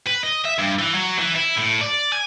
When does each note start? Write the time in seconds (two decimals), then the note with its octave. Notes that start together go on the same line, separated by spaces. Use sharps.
0.07 B4
0.23 D#5
0.45 E5
0.59 G2
0.79 E3
0.94 F#3
1.18 E3
1.35 E4
1.57 A2
1.81 D5
2.13 G#5